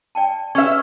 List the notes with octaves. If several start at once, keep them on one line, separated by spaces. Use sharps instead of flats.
D5 G5 A5
C#4 G#4 B4 E5